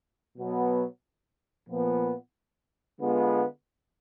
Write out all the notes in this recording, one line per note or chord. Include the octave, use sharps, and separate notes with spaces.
B2 F#3 B3
A#2 F3 B3
D3 G#3 B3 F4